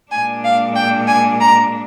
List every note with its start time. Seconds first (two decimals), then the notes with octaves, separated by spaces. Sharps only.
0.11 A#2 G#3 D4 G#5
0.44 F5
0.75 G5
1.08 G#5
1.40 A#5